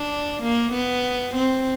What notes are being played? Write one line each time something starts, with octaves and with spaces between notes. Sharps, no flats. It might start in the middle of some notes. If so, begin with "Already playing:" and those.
Already playing: D4
A#3
B3
C4